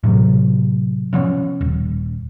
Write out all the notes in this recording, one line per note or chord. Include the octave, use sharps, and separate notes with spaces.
A2 C3 F#3
C3 F3 B3 C#4
D#1